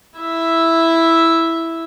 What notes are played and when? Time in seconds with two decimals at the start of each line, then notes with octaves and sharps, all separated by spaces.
0.18 E4 E5